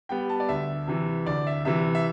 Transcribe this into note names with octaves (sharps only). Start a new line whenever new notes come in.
G3 B3 G5
A5
D5
D2 E5
C3 E3
D2 D5
E5
C3 E3 E5
E5